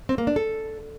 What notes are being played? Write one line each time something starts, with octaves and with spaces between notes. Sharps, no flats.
C4
A#3
D4
A4